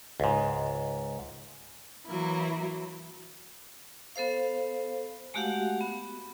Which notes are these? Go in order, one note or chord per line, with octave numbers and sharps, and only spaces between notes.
C#2 G#2
E3 F#3 A#3 E4
B3 A4 C5 F5
G#3 A3 F#4 G4 F5 F#5
B3